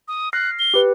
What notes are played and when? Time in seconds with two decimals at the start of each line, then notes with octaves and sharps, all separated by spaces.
0.08 D#6
0.33 F6 F#6 A#6 C7
0.59 G7
0.74 G4 B4